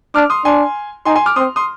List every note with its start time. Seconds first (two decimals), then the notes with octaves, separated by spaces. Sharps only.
0.15 D4 D6 F6
0.30 C6 D#6
0.45 D4 G#5 C6
1.05 D#4 G#5 C6
1.16 G#5 C6
1.26 D6 F6
1.36 C4 C6 D#6
1.56 C6 D#6